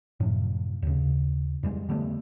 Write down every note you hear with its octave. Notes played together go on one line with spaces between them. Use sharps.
F#2 A2 C3 F3
D#2 C#3
F2 G3 G#3
D3 G3 A3 B3